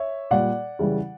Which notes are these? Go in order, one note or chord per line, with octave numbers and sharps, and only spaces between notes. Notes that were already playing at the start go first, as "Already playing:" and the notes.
Already playing: C#5 E5
A#2 G3 D5 F#5
C#3 E3 G3